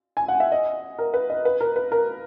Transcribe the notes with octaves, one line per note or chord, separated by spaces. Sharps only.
G#5
F#5
E5
D#5
A#4
B4
D#5
B4
A#4
B4
A#4